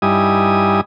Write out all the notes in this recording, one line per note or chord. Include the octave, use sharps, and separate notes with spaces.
G2 G3 D#4 E4 G#5 D#6